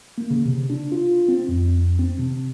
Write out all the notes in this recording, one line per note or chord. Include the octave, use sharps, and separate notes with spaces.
A#3
C#3
C3
D4
F4
C4
F2
C4
C3